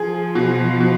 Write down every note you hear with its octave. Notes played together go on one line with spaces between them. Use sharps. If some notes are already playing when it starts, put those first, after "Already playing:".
Already playing: F3 G#4
B2
B2